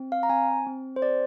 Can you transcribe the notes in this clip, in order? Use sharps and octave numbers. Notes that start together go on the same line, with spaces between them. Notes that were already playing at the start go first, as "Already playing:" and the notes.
Already playing: C4
F5
A#5
C4 G#5
C4
C5
G#4 D5